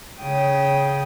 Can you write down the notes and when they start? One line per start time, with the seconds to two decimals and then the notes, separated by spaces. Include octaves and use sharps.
0.19 C#3 G5 D#6